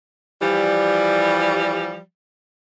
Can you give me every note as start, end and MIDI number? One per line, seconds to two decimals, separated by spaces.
0.41 1.98 52
0.41 1.98 53
0.41 1.98 55